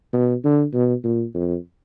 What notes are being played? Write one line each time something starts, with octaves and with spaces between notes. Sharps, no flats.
B2
D3
B2
A#2
F2